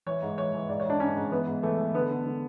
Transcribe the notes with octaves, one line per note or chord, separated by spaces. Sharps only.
E3 C#5
G#2
E3 C#5
E3
G#2 D5
C#5
G#2 D4
G#2 C#4
G#2
E3 B3
G#2
E3 A3
E3
D3 B3
D3
D3